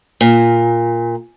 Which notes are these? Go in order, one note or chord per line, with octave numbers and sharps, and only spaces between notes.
A#2